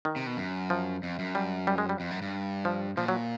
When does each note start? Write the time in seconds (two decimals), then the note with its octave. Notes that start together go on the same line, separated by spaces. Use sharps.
0.05 D#3
0.16 C3
0.27 B2
0.37 F#2
0.70 F3
1.03 F2
1.19 F#2
1.35 G3
1.67 G3
1.78 G#3
1.89 G3
2.00 F2
2.11 F#2
2.22 G2
2.65 F3
2.97 A#2 F3
3.08 F#3